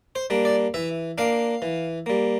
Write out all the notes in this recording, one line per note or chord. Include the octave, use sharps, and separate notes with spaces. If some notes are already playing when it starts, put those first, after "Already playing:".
C5
G3 A#3 D4
D5
E3 E5
A#3 D4 F5
E3
G3 A#3